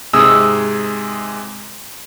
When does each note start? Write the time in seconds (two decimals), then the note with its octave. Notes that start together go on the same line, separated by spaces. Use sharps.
0.13 G#2 C3 G#3 G#5 D#6 E6